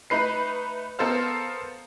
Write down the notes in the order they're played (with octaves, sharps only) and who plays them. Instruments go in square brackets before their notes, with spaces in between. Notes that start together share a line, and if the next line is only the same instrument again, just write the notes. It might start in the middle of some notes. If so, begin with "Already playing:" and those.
[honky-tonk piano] A3 D#4 B4 C7
B3 A4 A#4 C5 F5